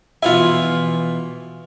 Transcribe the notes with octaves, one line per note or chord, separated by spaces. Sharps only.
B2 E3 F3 E4 F4 G#5